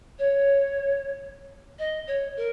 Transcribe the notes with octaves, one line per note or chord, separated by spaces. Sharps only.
C#5
D#5
C#5
A#4